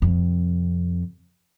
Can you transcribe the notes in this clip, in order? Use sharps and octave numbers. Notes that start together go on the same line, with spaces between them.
F2 C3